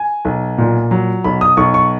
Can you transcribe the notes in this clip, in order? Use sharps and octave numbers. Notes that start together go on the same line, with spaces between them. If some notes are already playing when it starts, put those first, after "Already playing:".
Already playing: G#5
B1
A#2
F#3
B1 B5
D#6
B1 C#6
C#6